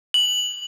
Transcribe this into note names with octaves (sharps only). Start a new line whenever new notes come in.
F#7